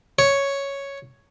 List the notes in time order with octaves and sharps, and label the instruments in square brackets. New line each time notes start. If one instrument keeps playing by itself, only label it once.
[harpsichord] C#5